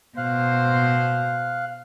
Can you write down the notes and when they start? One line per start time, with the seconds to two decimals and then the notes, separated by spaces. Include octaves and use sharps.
0.17 B2 C5 F5 F#6